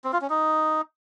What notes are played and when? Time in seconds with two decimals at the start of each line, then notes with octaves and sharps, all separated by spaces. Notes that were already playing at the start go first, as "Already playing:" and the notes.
0.04 C4
0.13 F4
0.21 C#4
0.30 D#4